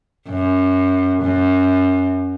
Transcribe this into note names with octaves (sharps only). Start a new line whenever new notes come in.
F#2
F#2